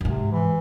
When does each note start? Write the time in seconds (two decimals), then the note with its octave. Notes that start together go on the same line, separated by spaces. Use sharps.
0.01 F#2
0.04 G#2 C3
0.32 E3